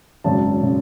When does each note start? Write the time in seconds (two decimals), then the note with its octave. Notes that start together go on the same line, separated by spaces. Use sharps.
0.24 G#1 F#2 C#3 A5
0.63 C#3